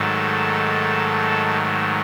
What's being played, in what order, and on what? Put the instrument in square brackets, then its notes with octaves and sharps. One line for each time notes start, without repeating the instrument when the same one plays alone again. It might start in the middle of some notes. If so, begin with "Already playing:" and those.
Already playing: [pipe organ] G#2 D#3 F#3 A3 A4